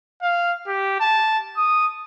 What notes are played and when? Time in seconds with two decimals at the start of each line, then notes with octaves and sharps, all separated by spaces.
0.22 F5
0.68 G4
1.00 A5
1.56 D#6